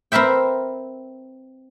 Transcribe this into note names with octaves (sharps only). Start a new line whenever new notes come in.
C4 A#4 B4 E5 G5